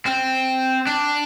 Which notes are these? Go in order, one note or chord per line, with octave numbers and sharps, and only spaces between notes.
C4
D4